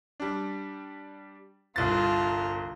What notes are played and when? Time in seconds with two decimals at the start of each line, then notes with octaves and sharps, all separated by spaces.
0.20 G3 D4
1.76 G1 C2 F4 A5 A#5 A6